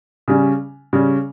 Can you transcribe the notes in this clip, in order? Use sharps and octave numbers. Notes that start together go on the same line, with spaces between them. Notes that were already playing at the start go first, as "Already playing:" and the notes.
C#3 G3 C#4
C#3 G3 C#4